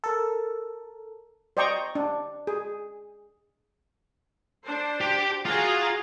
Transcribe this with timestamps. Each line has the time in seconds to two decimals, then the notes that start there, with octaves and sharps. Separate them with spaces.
0.04 A4 A#4
1.57 C5 D5 D#5 G5 A#5 C#6
1.95 D4
2.47 G#4
4.64 D4 C5
5.01 G4
5.46 F4 F#4 G#4 F5 A#5